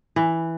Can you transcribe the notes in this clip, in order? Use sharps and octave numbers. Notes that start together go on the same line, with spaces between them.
E3